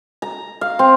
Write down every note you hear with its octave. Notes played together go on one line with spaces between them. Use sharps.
A#5
F5
C4